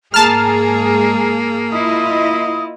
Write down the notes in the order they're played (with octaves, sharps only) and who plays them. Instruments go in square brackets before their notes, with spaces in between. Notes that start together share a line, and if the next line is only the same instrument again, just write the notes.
[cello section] G#2 G#4 [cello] A#3 [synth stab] A5 F6 [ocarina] A#5
[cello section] E4 F4 D#5 [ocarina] D#6